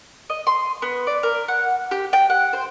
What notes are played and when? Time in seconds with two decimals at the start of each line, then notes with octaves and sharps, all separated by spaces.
0.30 D#5
0.47 C6
0.82 B3
1.07 D5
1.23 A#4
1.48 F#5
1.91 G4
2.13 G5
2.30 F#5
2.53 C5